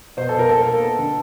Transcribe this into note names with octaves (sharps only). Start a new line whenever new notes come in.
B2 C5
A4
B2
A#4
A#3 A4
A#3
B3
D3